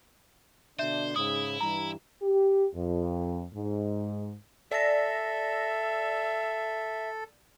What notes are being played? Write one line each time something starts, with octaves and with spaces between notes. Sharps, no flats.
B2 D3 D4 C5 E5 G6
G#2 C#3 E4 D#6
G2 E3 G3 A#5
G4
F2
G#2
A4 D5 E5 A#6